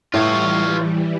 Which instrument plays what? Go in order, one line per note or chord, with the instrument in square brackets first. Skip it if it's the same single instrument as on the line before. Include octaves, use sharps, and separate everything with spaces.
[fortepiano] A2 [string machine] E3 G3 [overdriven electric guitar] F4 C#5